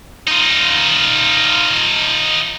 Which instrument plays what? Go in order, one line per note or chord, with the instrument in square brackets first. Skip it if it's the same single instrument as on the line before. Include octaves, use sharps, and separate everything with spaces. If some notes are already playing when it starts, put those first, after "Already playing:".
[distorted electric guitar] D#4 F4